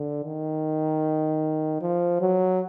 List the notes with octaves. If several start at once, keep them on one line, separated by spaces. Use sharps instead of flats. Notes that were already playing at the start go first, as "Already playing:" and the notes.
Already playing: D3
D#3
F3
F#3